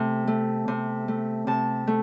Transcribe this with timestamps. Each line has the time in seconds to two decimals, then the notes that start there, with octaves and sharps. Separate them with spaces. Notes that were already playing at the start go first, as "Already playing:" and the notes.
Already playing: C3 A3
0.27 A3
0.68 C3
1.08 A3
1.47 C3 A5
1.87 A3